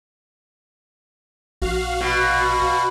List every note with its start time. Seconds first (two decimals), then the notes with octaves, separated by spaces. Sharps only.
1.62 A#1 F#4 F5
2.01 B2